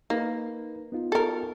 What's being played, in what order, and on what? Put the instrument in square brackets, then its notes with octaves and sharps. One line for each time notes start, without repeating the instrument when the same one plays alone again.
[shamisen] A#3 [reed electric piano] D#4 B4
[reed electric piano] B3 D#4 F4
[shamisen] A4 A#4